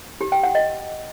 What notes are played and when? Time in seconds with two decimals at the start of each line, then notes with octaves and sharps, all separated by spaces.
0.21 G4
0.32 G5
0.43 F#5
0.55 D#5